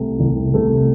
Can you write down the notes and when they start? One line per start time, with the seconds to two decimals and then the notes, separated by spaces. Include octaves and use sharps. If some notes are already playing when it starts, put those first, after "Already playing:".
Already playing: C2 C3 A3
0.19 C2
0.54 C3 A3